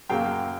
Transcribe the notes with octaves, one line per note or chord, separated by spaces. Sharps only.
F#2 C#3 F#3 A#3 F5 G5